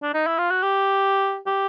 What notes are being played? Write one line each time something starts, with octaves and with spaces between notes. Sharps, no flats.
D4
D#4
E4
F4
F#4
G4
G4